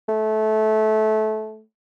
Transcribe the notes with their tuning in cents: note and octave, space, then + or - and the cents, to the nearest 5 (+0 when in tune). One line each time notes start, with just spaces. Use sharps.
A3 -20